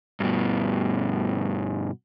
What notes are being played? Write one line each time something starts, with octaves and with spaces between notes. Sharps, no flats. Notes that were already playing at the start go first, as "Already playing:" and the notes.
G2 B2